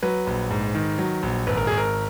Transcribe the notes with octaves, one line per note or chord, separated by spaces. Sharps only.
F#3 B4
A#1
G#2
D#3
F#3
A#1
G#1 B4
A#4
G#1 G#4
A#4